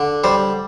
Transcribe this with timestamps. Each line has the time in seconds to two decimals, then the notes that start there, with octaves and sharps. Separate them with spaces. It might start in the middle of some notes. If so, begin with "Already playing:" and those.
Already playing: D3
0.24 G3 C5